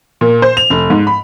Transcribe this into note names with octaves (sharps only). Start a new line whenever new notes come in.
A#2
C5
F7
F1
G#2
B5